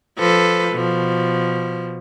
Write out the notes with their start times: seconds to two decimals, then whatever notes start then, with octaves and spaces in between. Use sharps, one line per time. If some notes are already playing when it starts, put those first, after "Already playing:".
0.18 F3 A4 B4
0.72 B2 F3